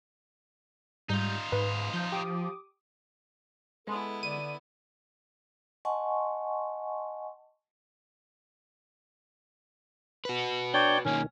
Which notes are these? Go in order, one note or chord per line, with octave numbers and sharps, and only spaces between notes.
G#2 G3 D#4 F4 G6
G#2 B4
F3 G6
G4 D6 D#6
G#3 B3 E4 A4
D3 D5 D#7
D#5 F#5 G#5 A5 C6 C#6
F#4 B4
D4 C#5 D5 G5 G6
B1 D#3 A#3 C#4